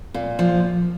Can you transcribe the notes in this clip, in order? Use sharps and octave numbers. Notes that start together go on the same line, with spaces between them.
A#2
F3